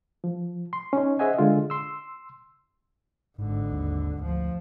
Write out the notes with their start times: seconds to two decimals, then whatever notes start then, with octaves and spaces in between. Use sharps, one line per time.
0.24 F3
0.73 C6
0.93 C#4 D#4
1.19 G#4 C5 D#5 E5 F#5 G#5
1.38 D3 G#3 F4
1.70 C6 E6
3.38 G#1 G#2 D3
3.72 D#2
4.21 D2 F3